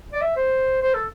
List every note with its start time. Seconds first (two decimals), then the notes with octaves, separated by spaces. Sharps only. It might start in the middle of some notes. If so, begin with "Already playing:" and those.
0.12 D5
0.21 E5
0.36 C5
0.82 C5
0.94 A4